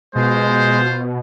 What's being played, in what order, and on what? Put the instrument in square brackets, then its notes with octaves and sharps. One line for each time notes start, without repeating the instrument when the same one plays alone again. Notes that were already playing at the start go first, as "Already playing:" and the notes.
[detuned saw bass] B2 [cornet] G#3 [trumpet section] F4 C5